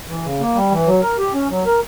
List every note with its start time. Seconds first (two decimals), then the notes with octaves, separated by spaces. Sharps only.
0.08 E3
0.24 C#3
0.40 A#3
0.55 G3
0.71 E3
0.87 F#3
1.02 A#4
1.18 G4
1.34 C#4
1.50 F#3
1.66 A#4